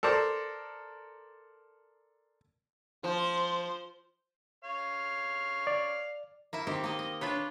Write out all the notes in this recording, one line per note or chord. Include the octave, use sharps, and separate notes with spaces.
A4 A#4 C5 D5
F3 C5
C#5 F5
D5
A#3 E4 E5
D#3 C4 G4
A#3 D#5
D#5
D4 F4 B4 C#5